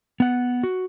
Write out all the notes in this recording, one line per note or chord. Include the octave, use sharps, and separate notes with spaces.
B3 F#5
F#4